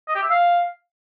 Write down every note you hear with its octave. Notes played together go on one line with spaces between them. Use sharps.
D#5
G4
E5
F5